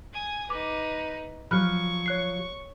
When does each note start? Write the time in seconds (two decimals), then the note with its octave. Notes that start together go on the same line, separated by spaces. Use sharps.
0.13 G#5 D#6
0.50 D#4 B4 D6
1.51 F3 F#3 B5 C#6 F6 F#6
2.06 C#5 F#6 C7